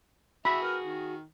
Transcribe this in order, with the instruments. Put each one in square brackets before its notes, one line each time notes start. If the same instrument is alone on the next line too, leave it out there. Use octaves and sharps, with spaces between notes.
[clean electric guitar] F#4 G#4 [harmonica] E5 [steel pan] B5
[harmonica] A#4 B4
D#3